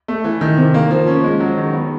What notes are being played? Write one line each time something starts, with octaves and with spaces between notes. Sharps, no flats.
A3
E3
D#3
C3
A#3
F3
C#4
G#3
F#3
D#3
B3